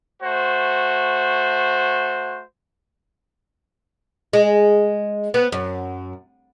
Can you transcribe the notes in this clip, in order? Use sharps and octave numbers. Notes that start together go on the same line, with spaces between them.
A3 F#4 C5
G#3
B3
F#2